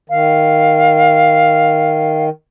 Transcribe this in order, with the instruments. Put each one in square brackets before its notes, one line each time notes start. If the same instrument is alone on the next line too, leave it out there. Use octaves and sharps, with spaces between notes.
[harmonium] D#3 [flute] F5